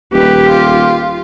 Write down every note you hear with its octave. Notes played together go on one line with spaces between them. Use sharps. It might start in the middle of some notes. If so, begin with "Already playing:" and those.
D#1 G4 B4
F4